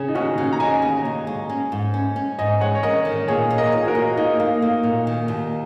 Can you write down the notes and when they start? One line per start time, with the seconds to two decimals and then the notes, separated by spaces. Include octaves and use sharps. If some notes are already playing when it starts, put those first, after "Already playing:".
Already playing: C#3 G#4 C#5
0.08 D#4
0.15 D#2 C#4 F#4
0.38 C#3
0.53 A#5
0.60 C#3 D#5 G#5
0.82 D#2
1.05 D#2
1.27 G#3
1.50 C#4
1.72 G#2
1.94 C#4
2.16 C#4
2.38 G#2 D#5 G#5
2.60 G#3 C#5 F#5
2.75 C#5
2.83 C#4 A#4 D#5
3.05 D#3
3.28 A#2 G#4 C#5
3.51 D#4
3.58 A#4 D#5
3.72 A#2
3.83 G#4
3.87 F#4 A#4
3.95 A#3
4.17 A#3 D#4
4.40 A#3
4.62 A#3
4.83 A#2
5.07 D#3
5.28 D#2